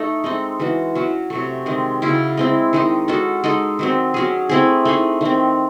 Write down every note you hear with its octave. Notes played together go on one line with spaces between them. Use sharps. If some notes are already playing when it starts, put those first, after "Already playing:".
Already playing: A3 D#4 A4
G#3 C4 D#4 A4
E3 G#3 C#4 F#4
F#3 C#4 F#4
C3 F#3 A3
D#3 G#3 C4
C#3 F#3 C#4 E4
G#3 C4 E4
D#3 G#3 D#4
G#3 C#4 F#4 A4
G#3 D#4 A4
D#3 F#3 C4
F#3 C#4 G#4
A3 C4 E4 G#4
A3 D#4 G#4
D#3 A3 C4